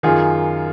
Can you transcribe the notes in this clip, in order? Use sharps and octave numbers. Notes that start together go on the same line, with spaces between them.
F#2 D#3 F4 G#4